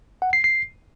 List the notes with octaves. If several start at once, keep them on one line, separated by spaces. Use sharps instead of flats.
F#5
C7
C7